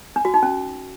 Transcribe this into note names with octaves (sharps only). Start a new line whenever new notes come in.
D4
F#4
D#4
C#4